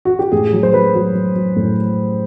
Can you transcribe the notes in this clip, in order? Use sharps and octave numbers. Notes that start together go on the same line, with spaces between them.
F#4
G4
A2 G#4
F#3
C5
F#3 B4
F#3
F#3
F#3
A2